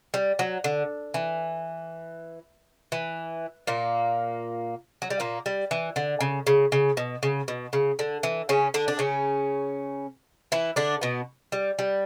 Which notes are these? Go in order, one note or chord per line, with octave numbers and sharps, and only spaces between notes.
G3
F#3
D3
E3
E3
A#2 A#3
F#3
G3
A#2 A#3
G3
E3
D3
C#3
C#3
C#3
B2
C#3
B2
C#3
D3
E3
C#3 C#4
D3 D4
D4
C#3 C#4
E3 E4
D3 D4
B2 B3
G3
G3